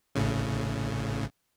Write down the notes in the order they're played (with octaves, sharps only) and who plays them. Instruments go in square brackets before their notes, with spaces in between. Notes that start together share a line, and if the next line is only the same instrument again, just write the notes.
[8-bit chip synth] A1 A2 C#3